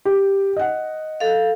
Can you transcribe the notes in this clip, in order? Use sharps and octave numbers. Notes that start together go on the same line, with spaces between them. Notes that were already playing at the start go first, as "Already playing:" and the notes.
G4
D#5 F#5
A4 F5